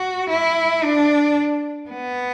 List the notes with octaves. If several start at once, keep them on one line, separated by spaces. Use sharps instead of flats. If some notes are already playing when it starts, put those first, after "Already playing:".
Already playing: F#4
E4
D4
B3